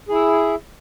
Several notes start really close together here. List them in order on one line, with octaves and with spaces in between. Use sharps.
G#4 E4 E5